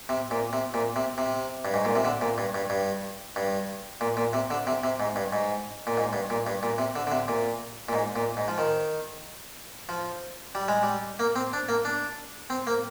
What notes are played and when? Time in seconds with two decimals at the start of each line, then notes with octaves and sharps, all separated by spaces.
0.09 C3
0.31 A#2
0.53 C3
0.74 A#2
0.96 C3
1.18 C3
1.65 G2
1.74 G#2
1.85 A#2
1.95 C3
2.05 D3
2.21 A#2
2.38 G2
2.54 G2
2.70 G2
3.36 G2
4.01 A#2
4.17 A#2
4.33 C3
4.51 D3
4.67 C3
4.84 C3
5.00 G#2
5.16 G2
5.33 G#2
5.87 A#2
5.97 G#2
6.13 G2
6.30 A#2
6.47 G2
6.63 A#2
6.78 C3
6.96 D3
7.07 D3
7.12 C3
7.28 A#2
7.89 A#2
7.93 G#2
8.16 A#2
8.37 G#2
8.48 F3
8.58 D#3
9.89 F3
10.55 G3
10.68 G#3
10.83 G3
11.19 A#3
11.36 C4
11.53 D4
11.69 A#3
11.85 D4
12.50 C4
12.67 A#3